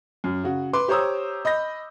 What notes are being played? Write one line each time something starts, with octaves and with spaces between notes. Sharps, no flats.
F#2
C#3 F#4
B4 C6 D6
G4 C5 C#5 A#5 D#6 E6
D#5 B5 G6 A#6